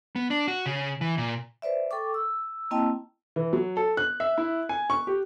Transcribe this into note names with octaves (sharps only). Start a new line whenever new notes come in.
B3
D4
F#4
C#3
E3
A#2
B4 C5 D5 E5
A4 G5 C#6 D6
E6
A#3 C4 E4 D#5 G5 A5
E3
F#3
A4
F#6
E5
E4
G#5
C#6
G4